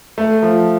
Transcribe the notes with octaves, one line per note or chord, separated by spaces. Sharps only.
A3
F3